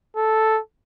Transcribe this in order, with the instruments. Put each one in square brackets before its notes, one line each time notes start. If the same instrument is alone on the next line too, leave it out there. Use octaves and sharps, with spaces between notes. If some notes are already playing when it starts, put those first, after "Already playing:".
[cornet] A4